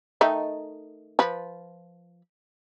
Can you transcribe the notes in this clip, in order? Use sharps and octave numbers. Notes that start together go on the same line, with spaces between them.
D#3 A3 D#4
F3 B4